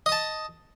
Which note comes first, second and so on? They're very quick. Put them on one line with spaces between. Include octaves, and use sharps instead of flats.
D#5 D#6 A5